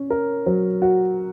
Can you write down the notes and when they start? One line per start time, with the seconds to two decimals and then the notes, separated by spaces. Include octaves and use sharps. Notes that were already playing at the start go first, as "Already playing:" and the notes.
Already playing: C#4
0.10 A#4
0.46 F#3
0.82 F#4